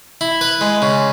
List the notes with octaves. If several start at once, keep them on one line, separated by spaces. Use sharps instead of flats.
E4
B4
G#3
C#3